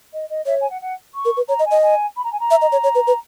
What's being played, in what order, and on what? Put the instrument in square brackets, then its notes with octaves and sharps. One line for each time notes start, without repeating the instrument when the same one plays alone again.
[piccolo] D#5
D#5
[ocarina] C#5 [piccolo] E5
[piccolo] G#5
F#5
F#5
C#6
[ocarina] A#4
B4
[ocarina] C#5 [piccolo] A#5
[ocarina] D#5
[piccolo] G#5
[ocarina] D#5
[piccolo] G#5
B5
A#5
G#5
A#5
[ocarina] E5
D#5
C#5
C#5
B4
B4